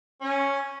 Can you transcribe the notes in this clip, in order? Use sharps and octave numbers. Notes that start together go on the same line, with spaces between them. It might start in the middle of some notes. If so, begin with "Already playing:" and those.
C#4